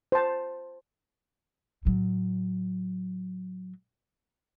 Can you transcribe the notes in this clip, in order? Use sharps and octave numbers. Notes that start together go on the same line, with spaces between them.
C5 A5
A2 F#3